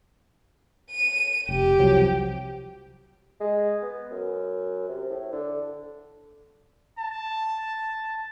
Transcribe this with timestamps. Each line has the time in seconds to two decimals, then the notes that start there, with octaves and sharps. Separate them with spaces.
0.91 D#7
1.49 F1 G4
1.79 C2 F3 F#3
3.40 G#3
3.82 B3
4.11 F#2
4.89 C3
5.10 A2
5.32 D3
6.98 A5